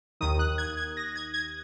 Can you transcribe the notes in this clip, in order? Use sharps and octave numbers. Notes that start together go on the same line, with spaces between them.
D#2 D#3 D#6
F#6
G#6
G#6
A#6
G#6
G#6